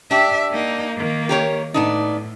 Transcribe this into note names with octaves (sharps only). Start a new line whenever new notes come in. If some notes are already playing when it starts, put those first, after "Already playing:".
D4 G4 E5
A#3 D#4
D#3 A#3
G4 A#4 C#5
A2 B3 D4 D#4